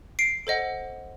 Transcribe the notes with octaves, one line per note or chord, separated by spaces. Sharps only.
C7 D7
A4 C5 D#5 F#5